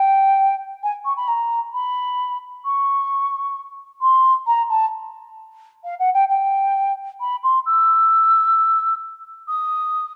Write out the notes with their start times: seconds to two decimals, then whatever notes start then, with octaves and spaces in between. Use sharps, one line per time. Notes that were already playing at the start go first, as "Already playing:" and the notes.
Already playing: G5
0.83 G#5
1.05 C#6
1.17 B5
1.28 A#5
1.73 B5
2.65 C#6
4.01 C6
4.46 A#5
4.69 A5
5.84 F5
5.99 F#5
6.14 G5
6.29 G5
7.20 B5
7.43 C6
7.66 E6
9.48 D#6